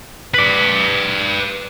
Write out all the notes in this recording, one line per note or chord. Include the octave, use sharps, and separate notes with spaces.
B4 D5